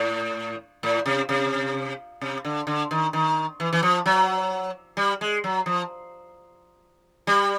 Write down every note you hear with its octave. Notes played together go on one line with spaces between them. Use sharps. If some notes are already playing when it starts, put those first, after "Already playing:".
Already playing: A2
A2
C3
C3
C3
D3
D3
D#3
D#3
E3
E3
F3
F#3
G3
G#3
F#3
F3
G3